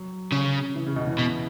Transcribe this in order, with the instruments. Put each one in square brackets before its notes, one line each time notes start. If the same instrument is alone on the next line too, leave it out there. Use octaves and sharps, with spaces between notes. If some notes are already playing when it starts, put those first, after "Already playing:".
Already playing: [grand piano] F#3
[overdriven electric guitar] C#3
[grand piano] E3
C#3
B2
E3
[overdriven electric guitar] B2